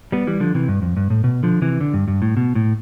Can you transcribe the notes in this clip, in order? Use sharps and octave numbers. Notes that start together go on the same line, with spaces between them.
G3 B3
E3 G3
D3 F3
C3 E3
G2
F2
G2
A2
B2
D3 F3
C3 E3
D3
G2
G2
A2
B2
A2